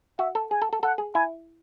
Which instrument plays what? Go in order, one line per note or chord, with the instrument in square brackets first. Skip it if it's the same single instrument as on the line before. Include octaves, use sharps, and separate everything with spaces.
[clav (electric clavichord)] F#4 [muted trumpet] E5
[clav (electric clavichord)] A4
[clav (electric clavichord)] G#4 [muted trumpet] G#5
[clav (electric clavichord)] A4
A4
[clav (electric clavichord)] A4 [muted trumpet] F#5
[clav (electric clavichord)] G#4
[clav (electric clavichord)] E4 [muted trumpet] G#5